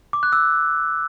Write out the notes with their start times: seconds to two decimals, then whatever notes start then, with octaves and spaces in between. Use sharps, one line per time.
0.13 D6
0.23 F#6
0.33 E6